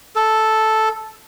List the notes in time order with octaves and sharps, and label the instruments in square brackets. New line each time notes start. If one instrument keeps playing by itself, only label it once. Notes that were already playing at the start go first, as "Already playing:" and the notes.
[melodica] A4